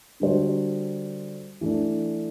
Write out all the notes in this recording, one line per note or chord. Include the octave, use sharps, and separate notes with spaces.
D3 G3 D4 F#4 C5
E3 A3 D4